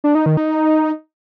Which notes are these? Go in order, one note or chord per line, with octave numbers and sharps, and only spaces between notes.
D4
D#4
D#3
D#4